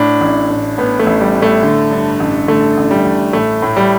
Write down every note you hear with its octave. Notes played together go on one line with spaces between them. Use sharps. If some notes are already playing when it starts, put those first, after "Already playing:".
Already playing: A2 D4
A1
A2
A2 B3
A3
A1
G3
A2
A3
D3
G2
A1
D3 A3
A1
G3
A1
A2 A3
A2
G3